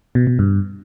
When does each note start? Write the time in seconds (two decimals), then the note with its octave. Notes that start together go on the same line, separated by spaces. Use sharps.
0.15 B2
0.27 B2
0.39 G2